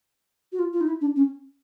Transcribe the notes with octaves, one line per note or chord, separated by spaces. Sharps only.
F#4
F4
F4
D#4
E4
D4
C#4